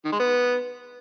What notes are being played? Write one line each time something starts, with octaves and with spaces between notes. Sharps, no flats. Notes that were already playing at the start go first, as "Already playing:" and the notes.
D#3
G#3
B3